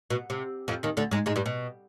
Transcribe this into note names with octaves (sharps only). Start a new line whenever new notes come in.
B2
C3
F2 F3
D#2 D#3
D2 D3
G#2 G#3
G#2 G#3
G2 G3
B2